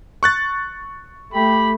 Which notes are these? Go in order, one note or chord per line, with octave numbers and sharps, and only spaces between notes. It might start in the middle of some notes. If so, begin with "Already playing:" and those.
C#6 F#6 A6
A3 G4 B5